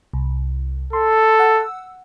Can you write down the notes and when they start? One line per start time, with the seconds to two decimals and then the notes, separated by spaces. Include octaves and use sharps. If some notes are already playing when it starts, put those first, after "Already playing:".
0.13 C2
0.93 A4 C6
1.39 F#5 E6